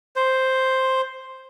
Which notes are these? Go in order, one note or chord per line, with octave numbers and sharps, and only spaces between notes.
C5